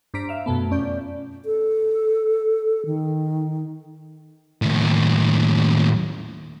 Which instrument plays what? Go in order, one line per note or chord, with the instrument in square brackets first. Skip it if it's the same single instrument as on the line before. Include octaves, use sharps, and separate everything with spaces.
[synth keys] G2 D4 C5 A#5 B6 D7
E5 F5
F#2 B2 A3 B3
F2 C#4 D5 G6
[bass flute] A4
D#3
[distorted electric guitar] D#2 A2